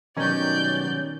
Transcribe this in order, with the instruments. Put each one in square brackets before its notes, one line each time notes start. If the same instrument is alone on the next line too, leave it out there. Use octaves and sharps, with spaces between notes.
[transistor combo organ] B2 F#3 G3 [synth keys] D#3 C#4 [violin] D5 G6